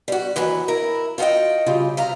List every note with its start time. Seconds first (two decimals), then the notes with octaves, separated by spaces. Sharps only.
0.08 G3 F#4
0.36 D#2 E3 F#3 F#4
0.68 E4 A#4
1.18 F4 F#4 G#4 D#5 G5
1.66 C#3 G3 F4
1.97 C3 F5 A#5